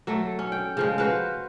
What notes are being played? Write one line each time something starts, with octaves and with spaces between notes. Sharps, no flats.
F#3 A3 A4
C#4
G5
C#3 F3 G#3
F#4 B4 C5 F5